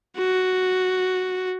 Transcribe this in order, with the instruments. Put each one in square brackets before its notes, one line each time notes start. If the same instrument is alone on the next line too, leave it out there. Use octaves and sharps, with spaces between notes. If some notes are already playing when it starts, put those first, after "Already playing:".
[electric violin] F#4